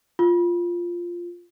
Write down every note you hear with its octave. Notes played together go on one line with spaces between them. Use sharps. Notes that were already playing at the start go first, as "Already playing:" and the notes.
F4